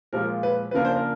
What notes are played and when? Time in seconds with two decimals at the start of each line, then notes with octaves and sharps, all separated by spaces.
0.13 A#2 F3 G#3 A#4
0.43 B4
0.71 B4
0.74 C#3 F3 A#3 D4 A#4
0.85 C5
0.96 A#4